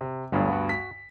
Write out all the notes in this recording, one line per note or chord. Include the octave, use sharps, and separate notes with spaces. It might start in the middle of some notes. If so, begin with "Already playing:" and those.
C3
G1 D2 G2 F#3 B3 F5
F#4
B6